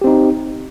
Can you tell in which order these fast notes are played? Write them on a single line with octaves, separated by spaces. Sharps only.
G4 C4 D#4